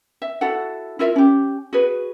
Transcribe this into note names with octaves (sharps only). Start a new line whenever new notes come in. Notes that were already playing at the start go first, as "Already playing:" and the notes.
E5
E4 F#4 A4 F#5
E4 F4 A#4 E5
C#4 G4
F#4 G#4 B4